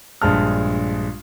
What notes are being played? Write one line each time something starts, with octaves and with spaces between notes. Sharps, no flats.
A#1 G2 G#3 A5 F6